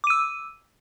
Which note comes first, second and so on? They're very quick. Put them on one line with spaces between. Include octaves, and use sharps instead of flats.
D6 D#7 E6